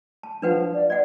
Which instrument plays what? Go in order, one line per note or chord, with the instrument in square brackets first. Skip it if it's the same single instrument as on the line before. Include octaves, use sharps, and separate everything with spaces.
[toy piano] A5
[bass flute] F3 [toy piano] D4 B4 F#5
[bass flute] D5
[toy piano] D5 F#5 [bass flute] D#5